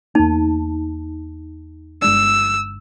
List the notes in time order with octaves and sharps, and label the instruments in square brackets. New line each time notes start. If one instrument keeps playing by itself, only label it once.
[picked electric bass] E2 A#3 [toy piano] D#4 A5
[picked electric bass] G1 G#3 D4 [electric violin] E6